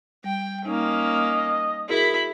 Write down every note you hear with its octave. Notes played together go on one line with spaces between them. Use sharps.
G3 G5
A#3 C#4 D#4 D#5
E4 F#4 G#4 A#4 B5